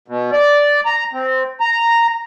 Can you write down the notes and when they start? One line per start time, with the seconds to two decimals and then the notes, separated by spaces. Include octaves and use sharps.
0.08 B2
0.32 D5
0.85 A#5
1.13 C4
1.60 A#5